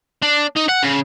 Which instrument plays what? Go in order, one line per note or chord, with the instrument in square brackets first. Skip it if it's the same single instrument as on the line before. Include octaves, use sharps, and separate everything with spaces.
[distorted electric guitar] D4
D#4
F#5
C#3